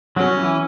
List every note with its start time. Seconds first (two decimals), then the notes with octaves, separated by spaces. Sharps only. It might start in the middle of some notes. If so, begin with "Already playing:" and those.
0.16 F#3 C#4 F#4
0.37 E3 E4